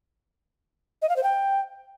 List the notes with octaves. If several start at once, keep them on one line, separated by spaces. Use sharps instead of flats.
D#5
F5
C5
G5